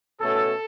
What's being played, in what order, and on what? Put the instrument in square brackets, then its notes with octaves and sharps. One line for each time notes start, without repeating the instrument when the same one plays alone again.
[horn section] B2 A3 C#4 A4